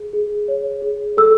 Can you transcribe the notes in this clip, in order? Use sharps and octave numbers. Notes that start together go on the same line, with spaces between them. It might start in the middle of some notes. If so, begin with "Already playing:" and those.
Already playing: G#4
G#4
C#5
G#4
A4 E6